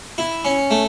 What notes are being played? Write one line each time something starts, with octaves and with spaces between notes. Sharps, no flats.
E4
C#4
A3